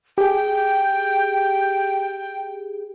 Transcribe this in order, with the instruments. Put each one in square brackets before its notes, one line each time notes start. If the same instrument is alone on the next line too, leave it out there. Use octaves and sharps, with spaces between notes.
[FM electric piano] G4 G#4 [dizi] G5